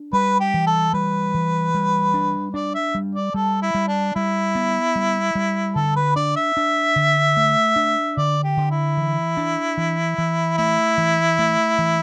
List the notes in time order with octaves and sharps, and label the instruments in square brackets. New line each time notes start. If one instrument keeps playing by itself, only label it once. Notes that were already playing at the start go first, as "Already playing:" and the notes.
Already playing: [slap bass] D4
[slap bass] G3 [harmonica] B4
[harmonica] G4
[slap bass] E3
[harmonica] A4
[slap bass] G3 [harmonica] B4
[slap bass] E3
G3
D4
[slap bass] D4 [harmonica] D5
[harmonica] E5
[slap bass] G3
[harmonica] D5
[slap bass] G3 [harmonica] A4
[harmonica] E4
[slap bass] G3
[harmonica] D4
[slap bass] G3 [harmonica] E4
[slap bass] B3
G3
G3
[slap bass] D3 [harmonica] A4
[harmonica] B4
[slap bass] D4 [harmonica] D5
[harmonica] E5
[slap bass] D4
D3
A3
D4
[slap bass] D3 [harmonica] D5
[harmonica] G4
[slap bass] D3
[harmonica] E4
[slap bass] E3
D4
E3
E3
[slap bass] A3 [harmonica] E4
[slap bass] E3
A3
E3